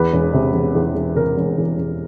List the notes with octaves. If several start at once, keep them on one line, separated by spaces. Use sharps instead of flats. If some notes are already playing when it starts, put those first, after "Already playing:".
Already playing: E2 B4
E1
C3
E1
E2
E1
C3 A#4
E1
E2
E1